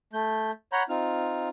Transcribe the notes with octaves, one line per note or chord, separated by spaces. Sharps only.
A3 G6
C#5 F#5 A#5 B5 G6
C4 D#4 F4 F6